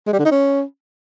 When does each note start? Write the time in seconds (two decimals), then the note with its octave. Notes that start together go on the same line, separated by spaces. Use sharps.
0.07 G#3
0.13 G3
0.19 D3
0.25 D#4
0.31 C#4